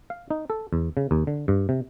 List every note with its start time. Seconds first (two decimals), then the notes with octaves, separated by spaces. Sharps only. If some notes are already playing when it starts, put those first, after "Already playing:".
0.10 F5
0.30 D#4
0.50 A4
0.73 E2
0.97 C#3
1.11 D#2
1.27 D3
1.48 G2
1.69 C3